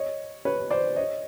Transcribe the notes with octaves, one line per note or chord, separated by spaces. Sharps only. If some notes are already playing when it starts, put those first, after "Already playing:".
Already playing: C#5 D#5
B4 C#5
C5 D5
C#5 D#5